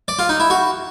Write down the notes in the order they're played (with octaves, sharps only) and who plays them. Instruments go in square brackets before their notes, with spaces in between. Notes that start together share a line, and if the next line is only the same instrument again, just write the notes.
[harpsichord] D5
F4
D#4
E4
F#4